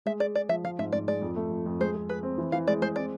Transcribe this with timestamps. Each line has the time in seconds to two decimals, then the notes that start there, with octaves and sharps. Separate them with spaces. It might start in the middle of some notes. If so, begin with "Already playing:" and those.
0.06 G#3 E5
0.20 G#4 D5
0.35 G#4 D5
0.49 F3 E5
0.64 F3 F5
0.79 G#2 E5
0.92 G#2 D5
1.08 G#3 D5
1.22 F2
1.36 A3
1.51 F2
1.66 F2
1.80 G#3 C5
1.95 G#4
2.09 G#4 B4
2.23 C4
2.38 E3
2.52 E3 F5
2.67 G#3 D5
2.82 G#3 C5
2.96 C4 D5